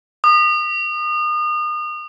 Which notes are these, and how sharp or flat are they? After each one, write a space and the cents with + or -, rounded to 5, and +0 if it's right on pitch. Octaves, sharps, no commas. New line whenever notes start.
D#6 -35